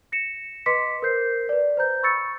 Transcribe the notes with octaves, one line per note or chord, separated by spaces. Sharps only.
A#6 C#7 E7
B4 D#5 C6 D6 B6 C#7
A#4 C5 G6 C7
B4 D5
C5 A#5 G6
B5 C#6 E6 A6 C#7